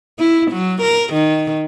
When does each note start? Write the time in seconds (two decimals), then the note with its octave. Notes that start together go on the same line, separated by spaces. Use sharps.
0.19 E4
0.51 F#3
0.82 A#4
1.13 D#3